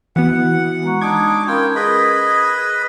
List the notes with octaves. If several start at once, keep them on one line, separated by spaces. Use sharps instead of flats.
E3 B3 F#4 F#5
G#3 A#5 C#6
D4 D#4 D6 G#6
C#4 F4 A#4 G5 B5
G#4 B4 D#5 B5